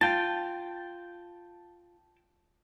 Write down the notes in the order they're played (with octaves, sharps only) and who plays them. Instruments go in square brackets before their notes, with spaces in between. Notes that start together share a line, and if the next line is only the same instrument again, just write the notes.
[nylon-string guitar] F4 [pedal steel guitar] G5 A5